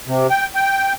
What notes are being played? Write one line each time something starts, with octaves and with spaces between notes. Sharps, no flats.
C3
G5
G5